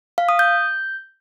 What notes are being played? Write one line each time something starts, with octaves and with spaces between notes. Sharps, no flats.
F5
D#6
G6